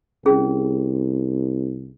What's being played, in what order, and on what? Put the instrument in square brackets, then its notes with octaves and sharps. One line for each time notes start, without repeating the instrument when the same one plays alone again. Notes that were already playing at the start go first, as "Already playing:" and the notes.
[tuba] C2 [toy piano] C#4 G#4